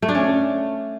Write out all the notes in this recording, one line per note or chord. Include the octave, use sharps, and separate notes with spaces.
A3
D4
C#4